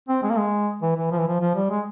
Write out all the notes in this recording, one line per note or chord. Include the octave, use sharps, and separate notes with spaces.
C4
G#3
A#3
G#3
E3
E3
F3
E3
F3
F3
G3
G#3